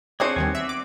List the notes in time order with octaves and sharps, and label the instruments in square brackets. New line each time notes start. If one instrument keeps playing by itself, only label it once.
[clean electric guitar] B3 C4 [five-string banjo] D4 C5 C#5 [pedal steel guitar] G#4
[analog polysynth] D#2 D#3 G3 [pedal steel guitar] G#5
[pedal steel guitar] D5 [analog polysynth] E5
[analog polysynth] D6